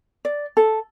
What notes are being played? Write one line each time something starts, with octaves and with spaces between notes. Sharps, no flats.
D5
A4